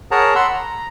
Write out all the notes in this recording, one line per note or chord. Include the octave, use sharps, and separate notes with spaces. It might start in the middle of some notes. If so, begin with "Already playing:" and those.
G#4 A#4 C#5 F#5 A5 A#5
F#5 B5 C6 E6
A#5